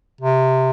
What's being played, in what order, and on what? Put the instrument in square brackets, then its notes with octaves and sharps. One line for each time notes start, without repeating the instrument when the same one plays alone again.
[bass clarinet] C3